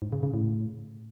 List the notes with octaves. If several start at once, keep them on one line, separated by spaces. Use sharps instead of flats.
G#2
C#3
C#3
A2